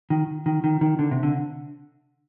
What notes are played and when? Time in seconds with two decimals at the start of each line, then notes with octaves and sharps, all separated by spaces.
0.10 D#3
0.46 D#3
0.64 D#3
0.81 D#3
0.99 D3
1.11 C3
1.23 D3